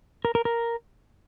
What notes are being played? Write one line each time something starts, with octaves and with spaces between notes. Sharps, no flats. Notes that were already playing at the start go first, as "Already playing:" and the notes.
A#4
A#4
A#4